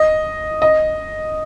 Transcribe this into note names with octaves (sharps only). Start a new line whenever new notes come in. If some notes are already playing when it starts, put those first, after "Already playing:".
Already playing: D#5
D#5